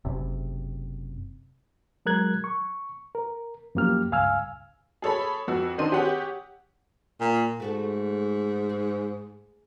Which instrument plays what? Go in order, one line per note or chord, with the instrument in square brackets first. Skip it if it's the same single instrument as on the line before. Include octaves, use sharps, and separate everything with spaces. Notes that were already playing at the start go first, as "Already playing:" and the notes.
[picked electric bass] F#1 C3
[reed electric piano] F#3 G#3 A#4 F#6 G#6
C#6
A#4
F#2 F3 A#3 G4 F6
C#2 G2 F5 G#5 E6 F6
[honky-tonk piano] G#4 A4 C#5 B5
F2 F#4 E6
D#3 C4 D4 D#5 C6 D#7
G4 G#4 C#5 F#5
[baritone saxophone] A#2
[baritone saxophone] G#2 [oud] A3 F#4 A4
[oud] G#4